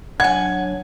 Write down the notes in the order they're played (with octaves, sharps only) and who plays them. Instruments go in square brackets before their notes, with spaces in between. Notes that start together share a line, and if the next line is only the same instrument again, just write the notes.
[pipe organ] F#3 D4 C#5 [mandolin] F#5 G#5 [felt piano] G#6